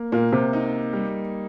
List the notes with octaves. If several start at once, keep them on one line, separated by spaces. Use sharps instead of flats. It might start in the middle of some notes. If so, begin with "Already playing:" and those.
Already playing: A#3
A#2 A#3
C3
D#4
G3